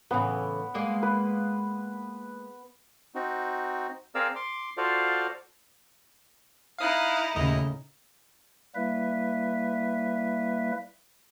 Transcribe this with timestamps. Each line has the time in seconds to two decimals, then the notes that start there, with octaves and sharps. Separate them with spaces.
0.11 A2 C#3 E3 B3
0.74 G#3 A#3 D5
1.03 B4
3.15 C4 D#4 F#4
4.15 C4 G#4 A#4 D5 F5 E6
4.36 C6 D6
4.77 F4 F#4 A4 C5 D5 F5
6.78 D#4 E4 F5 D#6 F#6
7.36 D#2 A#2 C#3 A3 D#5
8.75 G3 A#3 E4 B4 E5